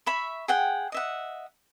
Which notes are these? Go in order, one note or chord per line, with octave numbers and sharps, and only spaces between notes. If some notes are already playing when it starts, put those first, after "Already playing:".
E5 B5 C#6
G#4 F#5 G5
D#5 E5 F#5